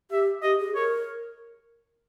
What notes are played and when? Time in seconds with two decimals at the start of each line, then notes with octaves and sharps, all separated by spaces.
0.11 G4 E5
0.42 G4 D#5
0.59 G#4
0.75 A#4 C#5